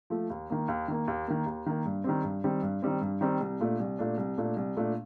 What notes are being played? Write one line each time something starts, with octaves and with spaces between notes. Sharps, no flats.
F3 A3
D#2
D#3 A#3
D#2
D#3 A#3
D#2
D#3 A#3
D#2
D#3 A#3
G2
D#3 G3 C4
G2
D#3 G3 C4
G2
D#3 G3 C4
G2
D#3 G3 C4
C2
A#2 A3 D4
C2
A#2 A3 D4
C2
A#2 A3 D4
C2
A#2 A3 D4